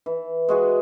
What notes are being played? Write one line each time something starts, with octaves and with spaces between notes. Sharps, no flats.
E3
G#3 F#4 G#4